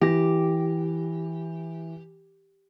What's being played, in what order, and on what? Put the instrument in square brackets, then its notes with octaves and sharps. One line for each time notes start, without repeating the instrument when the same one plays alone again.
[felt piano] E3 A#6 [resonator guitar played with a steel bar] G4